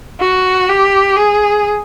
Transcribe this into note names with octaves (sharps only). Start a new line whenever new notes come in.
F#4
G4
G#4